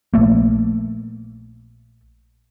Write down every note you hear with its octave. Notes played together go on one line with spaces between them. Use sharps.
A#1 A3 A#3